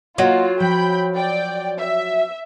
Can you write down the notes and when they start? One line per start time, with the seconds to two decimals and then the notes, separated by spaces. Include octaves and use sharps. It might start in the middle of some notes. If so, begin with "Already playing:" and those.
0.18 F#3 A#3 F4 D#5 F#5
0.60 F3 G5 B5 G6
1.16 D5 G5
1.79 E5